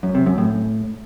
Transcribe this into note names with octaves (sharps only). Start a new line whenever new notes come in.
F#2
C3
F#2
A2